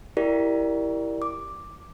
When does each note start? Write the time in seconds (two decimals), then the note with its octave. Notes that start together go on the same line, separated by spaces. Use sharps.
0.17 E4 G4 A#4 D5
1.22 D6